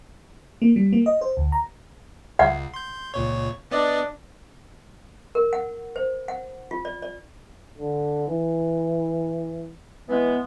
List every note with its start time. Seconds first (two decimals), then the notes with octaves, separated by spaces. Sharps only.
0.62 A#3
0.76 G3
0.93 A#3
1.06 D#5
1.21 C5
1.37 D2
1.52 A#5
2.39 C#2 F#5
2.74 C6 G6
3.14 C#2 A#2 C#5
3.71 B3 D4 D5 D#5
5.35 A#4
5.53 F#5
5.96 C5
6.28 F#5
6.71 F4
6.85 D5
7.02 D5
7.78 D3
8.28 E3
10.09 E3 G#3 B3